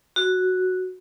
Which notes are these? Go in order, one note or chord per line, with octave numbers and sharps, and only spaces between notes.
F#4